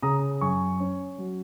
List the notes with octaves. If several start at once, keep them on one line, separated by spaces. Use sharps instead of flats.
C#3 A#5 D#6
F#2 G#5 C#6
C#4
F#3